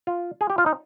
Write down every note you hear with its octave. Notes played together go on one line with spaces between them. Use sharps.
F4
G#4
G4
F4
D#4